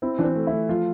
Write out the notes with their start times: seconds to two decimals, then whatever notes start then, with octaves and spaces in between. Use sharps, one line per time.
0.02 C4 E4
0.19 E3 D4
0.24 C4
0.36 A3
0.47 E4
0.52 A3
0.69 F3 F4